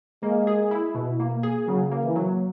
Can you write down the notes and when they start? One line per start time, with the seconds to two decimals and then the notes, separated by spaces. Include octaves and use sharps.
0.23 G#3 A#3
0.47 G#4
0.71 E4
0.95 B2
1.20 A#3
1.43 G#4
1.68 C#3 F#3
1.92 A#3
2.04 E3
2.15 F#3